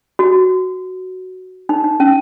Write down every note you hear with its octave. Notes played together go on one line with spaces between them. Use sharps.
F#4
D#4
D#4
C#4